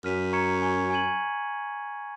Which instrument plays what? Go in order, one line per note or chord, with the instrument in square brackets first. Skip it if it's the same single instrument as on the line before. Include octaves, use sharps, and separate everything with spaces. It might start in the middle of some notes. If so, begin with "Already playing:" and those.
[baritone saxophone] F#2 [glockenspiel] F6 B6 D#7
[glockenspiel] A#5 C#6 G#6 C#7
G#5 C#6 G#6
G#5 C#6 G#6 D#7 F#7